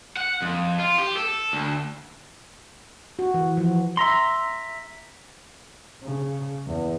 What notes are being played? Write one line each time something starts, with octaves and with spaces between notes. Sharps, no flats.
F#5
F2
F4
G4
A4
D2
F#4
E3
F3
E5 A#5 C6
C#3
E2